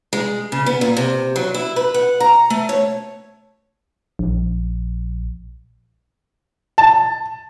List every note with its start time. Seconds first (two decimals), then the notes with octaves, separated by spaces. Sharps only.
0.13 G#3
0.52 C#3
0.66 B3
0.81 A#2
0.97 C3
1.36 F#3
1.54 E4
1.76 B4
1.94 F#5
2.20 A#5
2.50 A3
2.69 C#5
4.19 A#1
6.78 A5